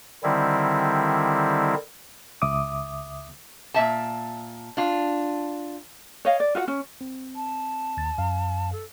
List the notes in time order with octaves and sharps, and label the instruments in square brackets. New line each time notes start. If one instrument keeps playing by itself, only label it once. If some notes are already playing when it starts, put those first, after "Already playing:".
[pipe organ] D3 D#3 G3 C4 E4
[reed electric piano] C#2 E5 D6 D#6
[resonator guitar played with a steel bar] A#2 E5 A5
D4 F4
[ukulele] C#5 D#5 F5
D5
F4 F#4 D#5 F#5
C#4
[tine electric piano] C4
[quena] A5
[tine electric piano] D#2 A6
F#2 F5
[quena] A4